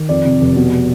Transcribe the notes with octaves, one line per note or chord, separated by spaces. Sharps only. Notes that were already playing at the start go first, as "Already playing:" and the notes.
Already playing: D#3
F2 D5
C3
F1
B2